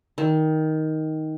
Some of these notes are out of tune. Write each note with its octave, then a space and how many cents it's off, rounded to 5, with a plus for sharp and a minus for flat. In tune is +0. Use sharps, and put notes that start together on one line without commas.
D#3 +10